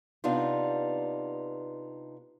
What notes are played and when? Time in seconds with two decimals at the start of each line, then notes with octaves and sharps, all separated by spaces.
0.24 C3 B3 D4 D#4 F4